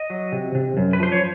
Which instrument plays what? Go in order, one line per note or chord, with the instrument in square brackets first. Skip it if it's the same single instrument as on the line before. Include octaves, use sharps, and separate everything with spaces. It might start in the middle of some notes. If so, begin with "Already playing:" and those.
Already playing: [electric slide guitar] D#5
F#3
C3
C3
F#2
B4
F3 C5
C#5